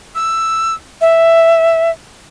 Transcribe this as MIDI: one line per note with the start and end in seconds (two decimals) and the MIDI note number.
0.15 0.74 88
1.01 1.91 76